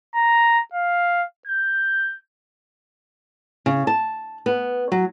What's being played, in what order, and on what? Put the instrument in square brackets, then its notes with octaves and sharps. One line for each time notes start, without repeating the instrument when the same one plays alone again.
[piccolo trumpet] A#5
F5
G6
[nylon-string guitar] C#3
A5
B3
F#3